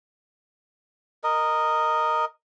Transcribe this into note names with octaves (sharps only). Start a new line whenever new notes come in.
A#4 D#5